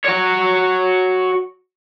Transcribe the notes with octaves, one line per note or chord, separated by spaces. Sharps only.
F#4 C#5